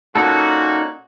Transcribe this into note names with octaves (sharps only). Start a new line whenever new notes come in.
A#2 C#4 D#4 F#4 A4